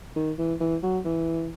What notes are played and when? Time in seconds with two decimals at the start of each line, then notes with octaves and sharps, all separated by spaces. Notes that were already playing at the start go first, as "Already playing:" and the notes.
0.16 D#3
0.38 E3
0.60 E3
0.83 F#3
1.05 E3